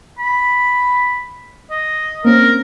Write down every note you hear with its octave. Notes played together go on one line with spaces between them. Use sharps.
B5
D#5
A#3 C4 C#4 A#4